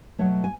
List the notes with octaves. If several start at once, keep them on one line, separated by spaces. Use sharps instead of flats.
B2 F#3 A3 C#5
G#5